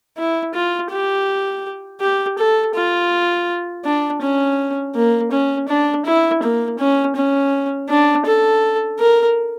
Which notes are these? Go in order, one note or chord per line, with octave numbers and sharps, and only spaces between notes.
E4
F4
G4
G4
A4
F4
D4
C#4
A#3
C#4
D4
E4
A#3
C#4
C#4
D4
A4
A#4